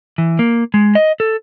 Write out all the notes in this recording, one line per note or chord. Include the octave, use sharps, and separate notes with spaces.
E3
A#3
G#3
D#5
A4